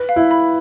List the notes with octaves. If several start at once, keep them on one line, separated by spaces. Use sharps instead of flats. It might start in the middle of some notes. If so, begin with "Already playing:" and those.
Already playing: B4
F5
E4
B5